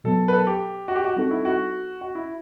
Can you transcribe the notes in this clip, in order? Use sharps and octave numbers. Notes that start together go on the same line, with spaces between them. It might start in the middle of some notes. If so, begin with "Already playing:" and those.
B2 F#3 B3 A4
B4
A4
G4
F#4
G4
F#4
G3 C4 D#4 F#4 A4
E4
F#4
F#4
E4